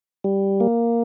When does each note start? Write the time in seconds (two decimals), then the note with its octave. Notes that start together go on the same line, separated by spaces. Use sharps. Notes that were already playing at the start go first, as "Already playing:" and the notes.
0.24 G3
0.60 A#3